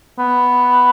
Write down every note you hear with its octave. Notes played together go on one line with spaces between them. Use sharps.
B3